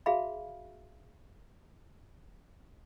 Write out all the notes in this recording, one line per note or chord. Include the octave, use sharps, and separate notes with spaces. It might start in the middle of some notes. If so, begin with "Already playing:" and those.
F#4 G#4 E5 F5 B5